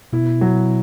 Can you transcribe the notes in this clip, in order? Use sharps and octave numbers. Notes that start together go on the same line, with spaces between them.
B2 E4
F#3